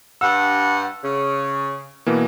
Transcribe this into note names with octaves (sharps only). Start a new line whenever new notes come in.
G2 F#5 E6
C#3
B2 E3 A#3